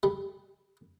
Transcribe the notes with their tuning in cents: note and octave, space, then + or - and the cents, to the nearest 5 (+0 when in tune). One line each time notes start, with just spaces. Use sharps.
G3 +10